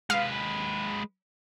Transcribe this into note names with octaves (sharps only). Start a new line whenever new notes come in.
G#3 B4 F5